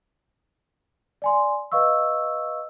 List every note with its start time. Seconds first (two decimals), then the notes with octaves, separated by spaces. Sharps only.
1.22 D5 G#5 C6
1.72 B4 D#5 F5 C#6 E6